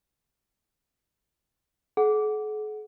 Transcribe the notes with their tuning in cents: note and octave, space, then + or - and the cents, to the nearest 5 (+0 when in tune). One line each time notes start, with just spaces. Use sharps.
G#4 +45 F#5 +0